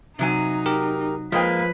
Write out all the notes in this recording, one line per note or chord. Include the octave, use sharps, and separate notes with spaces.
C3 F#3 D#4 G#5
G4 A#4
F3 G#3 A#3 B4 G5